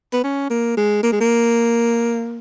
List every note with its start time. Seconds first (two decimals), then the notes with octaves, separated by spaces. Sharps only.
0.13 B3
0.24 C#4
0.50 A#3
0.77 G#3
1.03 A#3
1.12 G#3
1.21 A#3